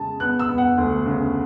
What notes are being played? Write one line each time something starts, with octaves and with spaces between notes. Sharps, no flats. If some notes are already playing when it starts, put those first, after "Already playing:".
Already playing: C#3 G#3 A5
B3 F#6
E6
B3
F#5
D2
C#3